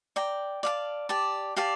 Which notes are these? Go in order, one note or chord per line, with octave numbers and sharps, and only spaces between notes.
D5 G5 A#5
D5 F5 A5
G4 D5 A5
G4 D5 F5 A5